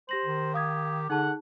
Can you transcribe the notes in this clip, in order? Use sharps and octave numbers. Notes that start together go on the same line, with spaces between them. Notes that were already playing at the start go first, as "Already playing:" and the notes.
G4 C5 A#6 F#7
D#3
G4 F5 D#6 G#6
D3 D#4 G#4 F#5 A5